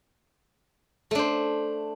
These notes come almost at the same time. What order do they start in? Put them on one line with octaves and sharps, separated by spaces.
A3 D4 C5